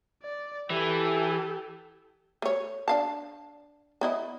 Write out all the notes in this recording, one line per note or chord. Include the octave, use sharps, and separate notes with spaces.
D5
E3 G4 A4
A3 C#5
D4 F5 A5
B3 E4 D#5